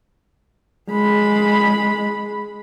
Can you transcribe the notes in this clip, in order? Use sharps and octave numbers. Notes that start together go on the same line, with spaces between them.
G#3 B5